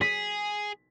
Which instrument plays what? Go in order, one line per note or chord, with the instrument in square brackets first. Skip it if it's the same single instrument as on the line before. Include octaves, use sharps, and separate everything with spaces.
[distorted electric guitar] G#4 [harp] B6